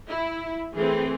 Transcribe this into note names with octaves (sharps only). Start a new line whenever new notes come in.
E4
E3 A3 C4 G#4